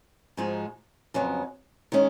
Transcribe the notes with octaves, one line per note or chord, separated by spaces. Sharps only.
G#2 F3 G#3 D#4 F#4
F2 C#3 F#3 B3
D#3 G#3 C#4